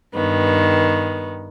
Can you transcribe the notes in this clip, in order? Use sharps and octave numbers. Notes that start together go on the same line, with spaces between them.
G2 D#3 B3